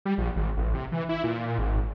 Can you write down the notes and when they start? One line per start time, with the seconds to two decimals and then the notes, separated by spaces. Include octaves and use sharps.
0.05 G3
0.18 A#1
0.36 G#1
0.57 A1
0.75 C3
0.92 E3
1.09 E4
1.24 A#2
1.58 G#1